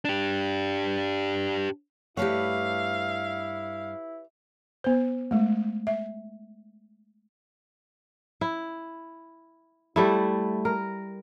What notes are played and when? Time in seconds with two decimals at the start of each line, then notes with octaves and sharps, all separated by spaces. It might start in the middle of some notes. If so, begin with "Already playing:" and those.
0.05 D4 G4
2.17 G2 A3 E4 G4 B4 C#5 F5 F#5
4.84 B3 C5
5.31 G#3 A3
5.87 E5
8.41 E4
9.96 G3 A3 E4
10.65 A#4